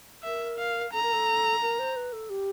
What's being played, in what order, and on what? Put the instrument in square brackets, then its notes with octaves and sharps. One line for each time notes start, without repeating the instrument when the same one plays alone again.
[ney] A#4 [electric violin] E5
[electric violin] F5
[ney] A4 [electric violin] A#5
[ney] A#4
A4
A#4
C5
B4
A4
G4